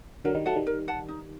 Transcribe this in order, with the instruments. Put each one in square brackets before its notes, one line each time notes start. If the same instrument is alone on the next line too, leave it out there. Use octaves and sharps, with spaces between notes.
[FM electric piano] D3 F#3 [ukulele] A#4
[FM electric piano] D#3 G3
[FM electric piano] F#3 A3 [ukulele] F#5 A5
[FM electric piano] D#3 G3
[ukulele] A#4
F#5 A5
D#4